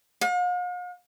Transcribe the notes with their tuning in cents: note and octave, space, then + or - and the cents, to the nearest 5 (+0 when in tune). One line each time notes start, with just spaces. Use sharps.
F5 +45